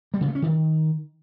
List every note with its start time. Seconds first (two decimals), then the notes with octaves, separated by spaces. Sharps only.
0.14 G3
0.21 C#3
0.28 A3
0.35 C#4
0.42 D#3